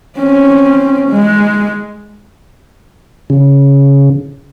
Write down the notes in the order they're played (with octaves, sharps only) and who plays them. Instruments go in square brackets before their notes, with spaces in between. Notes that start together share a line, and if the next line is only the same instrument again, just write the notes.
[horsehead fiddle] C4 C#4
G#3
[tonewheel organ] C#3